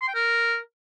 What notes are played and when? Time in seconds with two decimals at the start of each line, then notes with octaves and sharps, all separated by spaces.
0.01 C6
0.08 G5
0.14 A#4